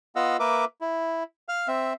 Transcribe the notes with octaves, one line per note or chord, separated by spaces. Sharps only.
B3 F4 D#5 F5 F#5 E6
A#3 A#4 B4 E5 D6
E4
F5 F6
C4 E5